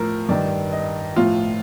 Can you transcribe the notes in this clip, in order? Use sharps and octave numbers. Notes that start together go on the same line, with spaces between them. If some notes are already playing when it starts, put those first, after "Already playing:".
Already playing: A2 F3 A#4
G2 D#3 D5
D#5
A2 F3 F4